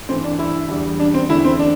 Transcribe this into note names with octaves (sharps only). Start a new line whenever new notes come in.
G2 E3 A3 C4
D4
E4
E2 D3 G3
D4
C4
E2 D3 A3 E4
C4
D4